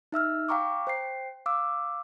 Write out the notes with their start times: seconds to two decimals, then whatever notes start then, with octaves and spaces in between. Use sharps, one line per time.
0.12 D#4 E5 E6 F6
0.49 F5 G5 A#5 C#6 D6
0.87 C5 G5 C7
1.46 F5 D6 E6